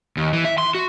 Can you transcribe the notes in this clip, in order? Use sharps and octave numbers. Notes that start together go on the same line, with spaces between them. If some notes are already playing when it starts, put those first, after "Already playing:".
D#2
E3
E5
C6
F#4